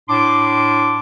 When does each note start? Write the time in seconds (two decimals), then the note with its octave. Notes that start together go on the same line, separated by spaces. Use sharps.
0.09 A2 D4 C6 D6